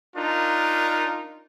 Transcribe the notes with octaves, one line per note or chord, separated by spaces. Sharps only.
D4 D#4 F4 A#4